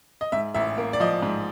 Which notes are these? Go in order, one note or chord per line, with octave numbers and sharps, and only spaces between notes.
D#5
G#2 E5
A1 E5
A#3
D5
F3 D#5
G#2